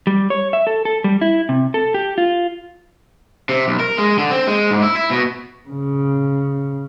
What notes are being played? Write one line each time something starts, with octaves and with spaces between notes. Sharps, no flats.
G3
C#5
E5
A4
A4
G3
E4
C3
A4
G4
F4
C3
B1
A#4
G#3
D3
C4
G#3
G#2
E4
E4
B2
C#3